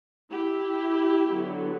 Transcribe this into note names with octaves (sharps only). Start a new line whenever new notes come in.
E4 G4
D3 F#3 B3